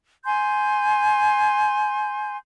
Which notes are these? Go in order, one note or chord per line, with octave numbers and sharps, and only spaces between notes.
G#5 C6 G6